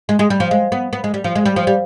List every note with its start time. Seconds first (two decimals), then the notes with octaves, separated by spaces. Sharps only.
0.09 G#3
0.19 G#3
0.30 G3
0.40 F3
0.51 G#3
0.72 B3
0.93 B3
1.04 G#3
1.14 G3
1.24 F3
1.35 G#3
1.46 G3
1.56 F3
1.67 G3